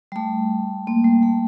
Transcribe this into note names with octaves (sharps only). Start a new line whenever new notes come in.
G3
A3
A#3
G3
A3